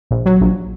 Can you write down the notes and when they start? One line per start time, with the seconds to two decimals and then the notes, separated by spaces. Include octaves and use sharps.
0.11 A#1
0.26 F#3
0.41 A#1